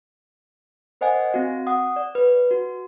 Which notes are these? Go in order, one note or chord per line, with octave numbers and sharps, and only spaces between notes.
A#4 C5 D#5 F#5 G#5
C4 F#4 F5
F#5 D#6
D5
B4
F#4